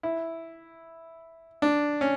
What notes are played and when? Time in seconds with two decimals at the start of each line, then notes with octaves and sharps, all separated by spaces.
0.03 E4
1.62 D4
2.01 C#4